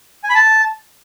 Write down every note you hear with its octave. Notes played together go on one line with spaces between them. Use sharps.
G#5
B5
A5